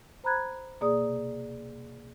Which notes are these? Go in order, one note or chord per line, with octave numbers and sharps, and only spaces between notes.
C5 A#5 B5 F#6 G#6
B2 A#3 G#4 D5 D#6
C3